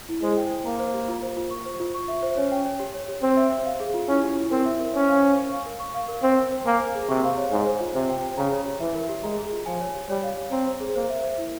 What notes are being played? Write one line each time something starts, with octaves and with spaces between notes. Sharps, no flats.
E4
G#3 C5
G5
C5
A#3 A#5
C5
G4
F4
C5
F4
C#6
C5
F4
C#6
E5
C5
C#4 C#5
G5
C#5
G4
C#5
G4
C4 C5
E5
C5
F5
G#4
F4
C#4 E4
G4
E4
C4 A#4
E5
A#4
C#4 C5
F5
C5
C#6
F5
A#4
C#6
F5
A#4
C4 C5
G5
C5
A#3 G#5
C5
G#4
C3 C#6
F5
C#5
G#2 G#5
C5
F4
C3 C5
G5
C5
C#3 A#5
C#5
G4
E3 E5
A#4
G4
G#3 A#5
G#4
F4
F3 G#5
C#5
G4
G3 C#5
F5
C#5
C4 A#5
C5
G#4
A#3 C5
E5
C5
E4